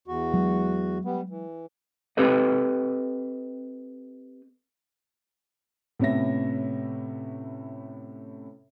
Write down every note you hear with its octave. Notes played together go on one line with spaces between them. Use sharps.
E2 F#4
F#3 G#3
G3 B3
E3
C4 G4 A4 B4 D#5
A2 C3 B3 C#4 E5 A#6